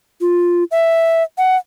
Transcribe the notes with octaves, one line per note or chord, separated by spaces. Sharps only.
F4
E5
F#5